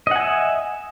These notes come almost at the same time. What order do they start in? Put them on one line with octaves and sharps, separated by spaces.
D#5 F#5 G#5 E5